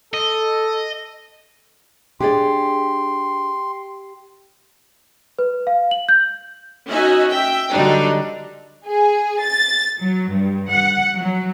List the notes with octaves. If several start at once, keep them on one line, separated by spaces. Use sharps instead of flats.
A4 D#5
D4 G4 G#4 D5 C6
B4
F5
F#7
G6
C#4 D#4 F#4 D#5 E5 G#5
E5 G5
D3 F#3 G3 D4 D#4
G#4
A6
F#3
G2
F#5
F#3